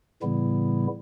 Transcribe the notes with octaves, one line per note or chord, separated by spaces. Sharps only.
A2 C#3 E3 G3 B3 E4